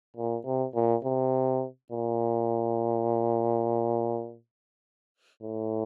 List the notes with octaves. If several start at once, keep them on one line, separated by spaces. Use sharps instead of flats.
A#2
C3
A#2
C3
A#2
A2